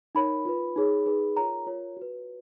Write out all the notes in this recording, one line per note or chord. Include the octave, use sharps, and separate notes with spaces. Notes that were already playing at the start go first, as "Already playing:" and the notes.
D#4 A#4 C#5 B5
F4 B4
D#4 G#4 C#5
D#4 G#4 B4
F4 A#4 C#5 A#5
F4 A#4 C#5
F#4 B4